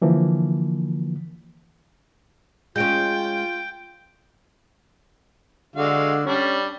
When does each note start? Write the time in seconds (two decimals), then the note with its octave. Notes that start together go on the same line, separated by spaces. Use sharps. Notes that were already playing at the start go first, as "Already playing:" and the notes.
0.02 D3 E3 F3 A#3
2.76 G#3 C#4 F4 G5 G6 D7
5.76 D3 G#3 F#4 F5
6.26 G3 C#4 D4